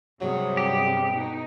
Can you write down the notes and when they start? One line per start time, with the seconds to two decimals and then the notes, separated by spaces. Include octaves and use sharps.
0.21 G2 C3 F#3 G3 G#4
0.57 G4
1.12 B2 D#4